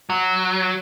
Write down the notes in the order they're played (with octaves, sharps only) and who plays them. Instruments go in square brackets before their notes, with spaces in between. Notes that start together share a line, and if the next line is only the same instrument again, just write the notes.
[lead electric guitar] F#3